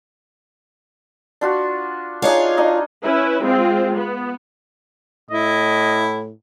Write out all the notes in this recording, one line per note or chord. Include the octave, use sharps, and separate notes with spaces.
D4 F4 F#4
D4 D#4 F4 G#4 C#5 F5
D4 D#4 D#5
C#4 E4 B4
G#3 C4 F4
B3
A2 E4 D#5